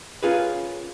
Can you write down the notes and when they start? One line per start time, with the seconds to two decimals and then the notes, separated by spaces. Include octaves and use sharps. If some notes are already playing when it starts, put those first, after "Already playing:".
0.23 C#4 F4 G#4 A#4 B4